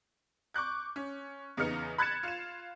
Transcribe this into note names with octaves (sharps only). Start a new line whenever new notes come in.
C#6 D6 F#6 G6
C#4
E2 C#3 B3 D#4 F6 C#7
B5 F#6 G#6 A6 C#7 E7
F4 E7